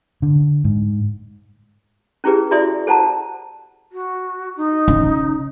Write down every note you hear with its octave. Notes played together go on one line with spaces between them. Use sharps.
D3
G#2
C#4 E4 G4 G#4 B4
E4 F#4 D5 E5 C6 D#6
A4 C5 F#5 A5 A#5
F#4
D#4
C#3